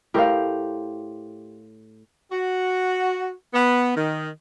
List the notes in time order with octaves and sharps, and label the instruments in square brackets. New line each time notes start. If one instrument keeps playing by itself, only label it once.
[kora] A2 G4 [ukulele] A#4 C5 F5
[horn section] F#4
B3
D#3